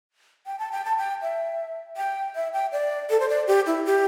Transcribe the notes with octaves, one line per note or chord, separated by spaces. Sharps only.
G5
A5
G5
A5
G5
E5
G5
E5
G5
D5
A4
C5
D5
G4
E4
G4